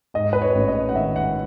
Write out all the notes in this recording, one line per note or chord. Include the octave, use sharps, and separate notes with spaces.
G#2 D#5
B4
C#5
A1
D#5
F#5
D#3 E5
F#5